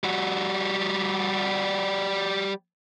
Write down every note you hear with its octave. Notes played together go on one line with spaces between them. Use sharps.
G3 F#4